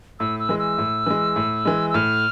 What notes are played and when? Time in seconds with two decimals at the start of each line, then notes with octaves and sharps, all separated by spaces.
0.20 A2 E6
0.39 E6
0.49 E3 G#3
0.59 E6
0.78 A2
1.06 E3 G#3
1.36 A2
1.65 E3 G#3
1.90 E6
1.94 A2 F6